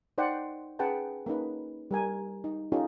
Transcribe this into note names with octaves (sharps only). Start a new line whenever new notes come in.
D#4 C5 D5 F#5 G5
C#4 G#4 B4 F#5 G5 A5
A#3 C#4 D#4 B4
G3 A#4 G#5
D#4
C#4 D#4 F4 G4 A4